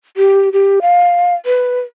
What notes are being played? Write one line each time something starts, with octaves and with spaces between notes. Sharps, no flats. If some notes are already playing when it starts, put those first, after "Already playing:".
G4
G4
F5
B4